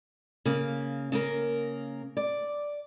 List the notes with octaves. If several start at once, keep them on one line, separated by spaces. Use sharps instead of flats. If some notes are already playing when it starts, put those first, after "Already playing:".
C#3 A#3
C#3 A#3 A#4
D5